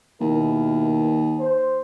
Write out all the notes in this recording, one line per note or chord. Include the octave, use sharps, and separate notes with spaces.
D#2 B2 E4 A#4
C5